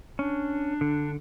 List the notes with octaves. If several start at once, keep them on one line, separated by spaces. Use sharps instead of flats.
C#4 D4
D3